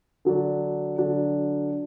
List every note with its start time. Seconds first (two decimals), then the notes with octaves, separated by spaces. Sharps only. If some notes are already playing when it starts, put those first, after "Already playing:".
0.25 D3 F#3 D4
0.98 D3 F#3 D4